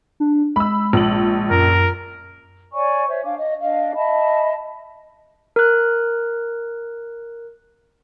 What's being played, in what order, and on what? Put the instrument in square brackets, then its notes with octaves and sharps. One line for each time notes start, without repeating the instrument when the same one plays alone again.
[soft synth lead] D4
[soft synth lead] G#3 [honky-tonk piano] B5 E6
[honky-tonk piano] A#1 F#7
[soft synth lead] F#2 [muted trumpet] A#4
[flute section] C#5 D5 G#5 C#6
C5 C#5 E5
D4 F5 D6
D#5
D4 D#5 F5
D#5 E5 A5 B5
[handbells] A#4 F#6